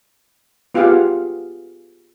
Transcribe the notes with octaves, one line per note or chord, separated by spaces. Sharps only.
B3 F4 G4 G#4 F5 F#5